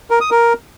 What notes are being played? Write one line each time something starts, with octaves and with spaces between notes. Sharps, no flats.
A#4
D#6
A#4